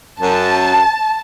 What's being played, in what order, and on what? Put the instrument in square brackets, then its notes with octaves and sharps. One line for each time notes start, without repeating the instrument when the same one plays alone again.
[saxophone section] F#2 [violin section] A5